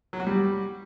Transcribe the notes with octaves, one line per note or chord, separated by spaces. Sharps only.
F#3
F#4
G3